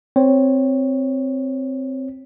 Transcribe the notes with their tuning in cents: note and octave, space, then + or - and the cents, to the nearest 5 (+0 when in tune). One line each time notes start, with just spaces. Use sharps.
C4 +0 C#5 +0